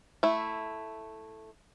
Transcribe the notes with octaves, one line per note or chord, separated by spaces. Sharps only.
A3 E4